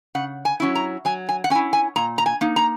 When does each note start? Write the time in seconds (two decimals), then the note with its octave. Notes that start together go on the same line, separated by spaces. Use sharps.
0.15 C#3 F#5
0.45 G#5
0.60 F#3 C#4 E4
0.75 A#5
1.05 F#3 G#5
1.29 G#5
1.44 F#5
1.50 C#4 G#5
1.55 E4
1.73 G#5
1.96 A#2 A#5
2.18 A#5
2.26 G#5
2.41 A#3 D#4
2.56 A#5